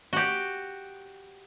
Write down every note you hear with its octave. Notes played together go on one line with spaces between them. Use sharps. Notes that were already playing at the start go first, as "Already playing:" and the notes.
F#4 G4